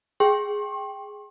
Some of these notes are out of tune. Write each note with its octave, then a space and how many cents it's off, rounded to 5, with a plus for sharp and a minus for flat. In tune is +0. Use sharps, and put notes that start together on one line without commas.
G#4 +0 G5 +0 C6 +45